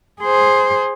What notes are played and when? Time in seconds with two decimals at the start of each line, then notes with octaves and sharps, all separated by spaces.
0.22 G#4 C5